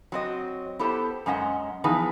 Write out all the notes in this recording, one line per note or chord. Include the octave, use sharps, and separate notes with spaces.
F#3 C4 D#5
B3 E4 G4 A4 C5
F#2 G#3 C#4 D#5 F#5
E3 F3 B3 D#4 G#4 B4